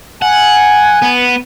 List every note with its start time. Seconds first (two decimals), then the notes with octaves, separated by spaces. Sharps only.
0.22 F#5 G#5
1.02 B3